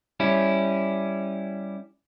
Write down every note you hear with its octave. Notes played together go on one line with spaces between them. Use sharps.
G3 C#4 E4